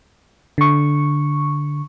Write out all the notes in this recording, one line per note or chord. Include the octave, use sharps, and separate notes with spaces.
D3 C#6